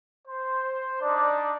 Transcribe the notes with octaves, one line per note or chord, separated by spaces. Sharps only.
C5
D4 D#4 D5